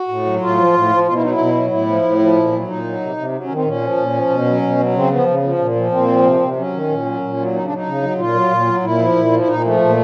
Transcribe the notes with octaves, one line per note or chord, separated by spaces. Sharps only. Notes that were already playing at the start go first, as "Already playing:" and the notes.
Already playing: F#4
A2
F#3
A2 F4
F3
A2
F3
B2 F4
E4
F#3 D#4
E4
B2
F#3
A2 E4
F3
A2
F3
A#2
F#3
A#2 D#4
F#3
C3
C3
F#3
C#4
D#3
C4
A#2 C#4
F3
A#2
F3
B2
F#3
B2
F#3
C#3 C4
F3 B3
C#3
F3
A#2
F3
A#2 C4
F3
C3
C3
F#3 C#4
D#3
A#2
F#3
A#2
F#3
C#3 D#4
D4
F#3 D#4
C#3
F#3
A#2 F4
F#3
A#2
F#3
A#2 E4
F3
A#2
F3
E4
A#2 D#4
F3 A3
A#2